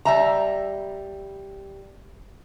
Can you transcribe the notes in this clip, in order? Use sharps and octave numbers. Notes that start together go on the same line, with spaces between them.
G3 E5 A#5